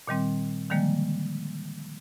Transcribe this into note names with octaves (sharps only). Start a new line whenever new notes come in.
A#2 D#3 G3 C4
D3 D#3 F3 G3 G#3 A#3